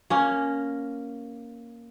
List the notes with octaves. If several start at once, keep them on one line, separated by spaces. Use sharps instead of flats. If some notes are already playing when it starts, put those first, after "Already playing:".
A#3 C#4